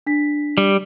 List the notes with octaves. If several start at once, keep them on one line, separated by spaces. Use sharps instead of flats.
D4 B6
G3